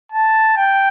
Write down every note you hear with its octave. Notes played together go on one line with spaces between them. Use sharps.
A5
G5